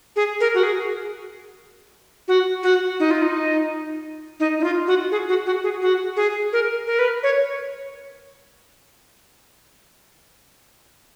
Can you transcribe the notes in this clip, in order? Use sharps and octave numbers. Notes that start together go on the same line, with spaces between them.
G#4
A#4
F#4
G#4
F#4
F#4
D#4
F4
D#4
D#4
D#4
F4
F#4
G#4
F#4
F#4
G#4
F#4
G#4
A#4
A#4
B4
C#5